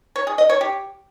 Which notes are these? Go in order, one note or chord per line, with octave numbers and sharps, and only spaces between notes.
C#5
G#4
D#5
C#5
G4